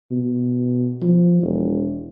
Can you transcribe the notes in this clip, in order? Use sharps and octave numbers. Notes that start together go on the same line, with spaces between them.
B2
F3
E1